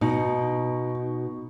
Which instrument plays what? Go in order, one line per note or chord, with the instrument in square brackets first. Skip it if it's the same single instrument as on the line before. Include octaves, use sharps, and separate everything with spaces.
[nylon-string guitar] B2 [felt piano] D#4